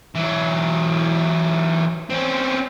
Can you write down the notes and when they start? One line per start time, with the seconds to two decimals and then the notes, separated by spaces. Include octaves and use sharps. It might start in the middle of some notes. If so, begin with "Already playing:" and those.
0.15 E3 F#3
2.10 C4 C#4